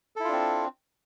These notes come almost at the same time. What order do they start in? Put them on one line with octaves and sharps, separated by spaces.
A4 E4 F4 D4 C4